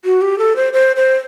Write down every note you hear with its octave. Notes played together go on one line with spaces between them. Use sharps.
F#4
G4
A4
C5
C5
C5